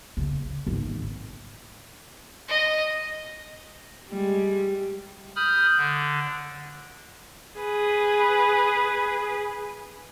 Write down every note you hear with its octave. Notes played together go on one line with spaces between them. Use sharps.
C#3
G#1
D#5
G3 G#3
B5 D#6 F6 G6
D3
G#4 B4